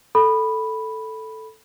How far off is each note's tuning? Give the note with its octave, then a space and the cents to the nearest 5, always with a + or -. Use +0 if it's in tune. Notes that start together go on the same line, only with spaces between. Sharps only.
A4 +0 B5 -5